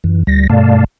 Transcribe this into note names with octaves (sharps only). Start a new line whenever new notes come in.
F#2 E3
D2 G3 A#6
G2 B2 A3 D5 F5 A5